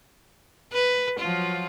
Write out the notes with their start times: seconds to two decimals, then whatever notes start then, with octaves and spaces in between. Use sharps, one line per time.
0.73 B4
1.19 F3 F#3 F4